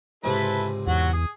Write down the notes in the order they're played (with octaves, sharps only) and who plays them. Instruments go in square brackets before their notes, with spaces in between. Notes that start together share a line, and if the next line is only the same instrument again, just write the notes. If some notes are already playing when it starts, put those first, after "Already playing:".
[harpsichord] C#2 G#2 C3 [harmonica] E4 A4 B4
[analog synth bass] E2 [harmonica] F#3 F#4 F#5
[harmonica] G#4 D#6